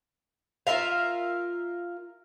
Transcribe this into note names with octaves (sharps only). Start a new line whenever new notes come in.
F4 A#4 E5 F5